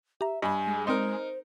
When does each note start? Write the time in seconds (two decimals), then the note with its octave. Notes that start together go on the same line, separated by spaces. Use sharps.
0.21 G4 E5 A#5
0.42 G2 D#5 G#5 B5
0.67 G#3
0.87 C4 D#4 A#4 C5 D5 C6